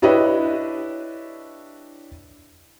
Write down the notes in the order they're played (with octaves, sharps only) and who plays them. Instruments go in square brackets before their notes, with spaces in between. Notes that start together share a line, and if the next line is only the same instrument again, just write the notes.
[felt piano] D4 E4 G4 B4 C#5 D#5